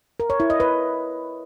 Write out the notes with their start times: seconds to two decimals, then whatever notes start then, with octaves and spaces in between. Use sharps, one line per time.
0.20 A#4
0.30 C#5
0.40 E4
0.50 D#5
0.60 B4